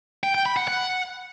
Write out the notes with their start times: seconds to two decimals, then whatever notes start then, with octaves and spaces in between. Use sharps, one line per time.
0.24 G5
0.35 G5
0.46 B5
0.57 F#5
0.68 F#5